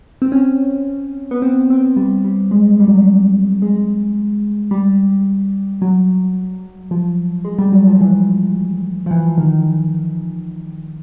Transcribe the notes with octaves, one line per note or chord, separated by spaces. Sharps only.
C4
C#4
B3
C4
C4
G3
G3
G#3
G3
F#3
G3
G#3
G3
F#3
F3
G#3
G3
F#3
F3
E3
F3
E3
D#3